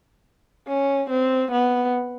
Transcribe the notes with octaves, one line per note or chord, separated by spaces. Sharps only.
C#4
C4
B3